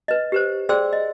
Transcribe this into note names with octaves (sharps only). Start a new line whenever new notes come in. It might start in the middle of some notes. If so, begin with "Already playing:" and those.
B4 D#5
G4 B4 C5
G#4 C5 D5 G5 C6 E6
D#5